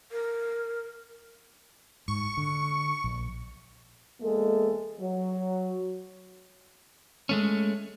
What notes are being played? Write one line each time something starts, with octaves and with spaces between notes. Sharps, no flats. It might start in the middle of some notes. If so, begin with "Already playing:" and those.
A#4
G#2 C#6
D3
A#1
E2 G#3 A#3 A4
F#3
G#3 A3 C#4